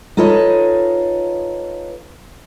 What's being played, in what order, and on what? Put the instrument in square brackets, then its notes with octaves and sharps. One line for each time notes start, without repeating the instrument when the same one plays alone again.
[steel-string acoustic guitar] D#4 F4 A4 B4 C#5 D#5